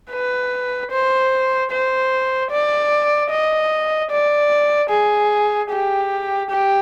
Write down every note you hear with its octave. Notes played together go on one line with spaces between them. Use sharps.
B4
C5
C5
D5
D#5
D5
G#4
G4
G4